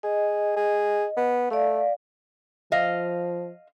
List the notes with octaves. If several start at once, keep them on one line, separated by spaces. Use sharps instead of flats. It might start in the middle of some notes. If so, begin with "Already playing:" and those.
G#4 D#5
G#4
B3
A3 D5 F5
F3 D#5 F5